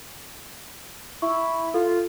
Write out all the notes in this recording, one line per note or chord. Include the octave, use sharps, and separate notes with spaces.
E4 C#6
F4 A4